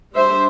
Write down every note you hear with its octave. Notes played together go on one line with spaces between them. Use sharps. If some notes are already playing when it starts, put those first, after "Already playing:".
G3 D4 C5 E5